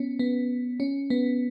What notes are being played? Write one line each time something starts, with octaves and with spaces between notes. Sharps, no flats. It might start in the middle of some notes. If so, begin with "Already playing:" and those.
Already playing: B3 C#4
B3
C#4
B3